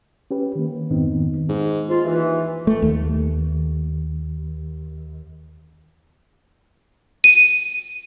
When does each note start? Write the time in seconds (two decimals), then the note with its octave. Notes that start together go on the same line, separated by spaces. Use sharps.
0.31 C#4 G4 B4
0.55 D#3 A#3
0.90 F2 G#2 D#3 B3 C4 D#4
1.49 G#2
1.89 D#2 G#2 F4
2.05 E3
2.67 A3
2.82 D#2
7.24 D#7